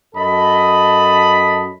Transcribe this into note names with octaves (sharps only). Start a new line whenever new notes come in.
F#2 A4 D#5 A5 B5